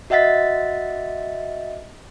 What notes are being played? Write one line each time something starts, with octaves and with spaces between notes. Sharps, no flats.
F#4 D#5 E5 F#5 A6 B6